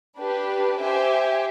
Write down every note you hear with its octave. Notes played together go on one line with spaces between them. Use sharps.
D4 G4 B4
G4 C5 E5 G#5